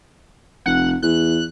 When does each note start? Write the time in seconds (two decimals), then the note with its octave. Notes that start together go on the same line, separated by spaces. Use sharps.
0.66 F1 F#5
1.02 E2 F#6